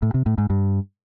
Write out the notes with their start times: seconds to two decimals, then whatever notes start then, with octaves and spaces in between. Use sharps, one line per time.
0.02 A2
0.14 C3
0.26 A2
0.38 G#2
0.50 G2